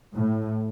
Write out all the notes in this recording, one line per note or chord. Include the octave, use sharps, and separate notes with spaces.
A2